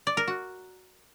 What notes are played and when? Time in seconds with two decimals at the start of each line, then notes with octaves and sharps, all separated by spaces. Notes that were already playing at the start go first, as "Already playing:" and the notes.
0.07 D5
0.17 A#4
0.28 F#4